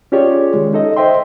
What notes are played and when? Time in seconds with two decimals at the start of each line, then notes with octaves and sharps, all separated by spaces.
0.12 C#4 F4 G4 G#4 C#5 D5
0.54 D#3 G#3
0.73 D#4 A4 D#5
0.97 C5 D#5 E5 G5 C6